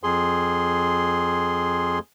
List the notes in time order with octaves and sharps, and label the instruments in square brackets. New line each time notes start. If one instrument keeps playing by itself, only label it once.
[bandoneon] F2 G#4 C6